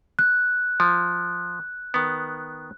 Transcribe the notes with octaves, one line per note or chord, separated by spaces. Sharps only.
F#6
F3
D#3 B3